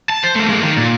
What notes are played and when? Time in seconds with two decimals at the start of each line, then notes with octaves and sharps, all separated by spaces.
0.10 A5
0.24 C5
0.36 A3 A#3
0.49 G#3 A#3
0.63 D#3
0.77 A#2